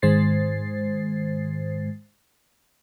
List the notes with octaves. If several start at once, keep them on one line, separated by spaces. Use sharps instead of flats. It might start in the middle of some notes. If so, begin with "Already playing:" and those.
G#2 D#3 G#3 C5 A6 C7